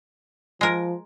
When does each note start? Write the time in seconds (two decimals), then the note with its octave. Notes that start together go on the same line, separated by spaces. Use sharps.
0.61 F3 G#3 A#4